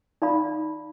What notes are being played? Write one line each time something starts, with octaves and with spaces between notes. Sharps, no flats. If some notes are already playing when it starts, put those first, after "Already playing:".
D#4 D5 F5 B5